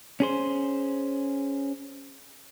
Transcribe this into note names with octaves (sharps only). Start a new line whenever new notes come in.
C#4 G#4 C5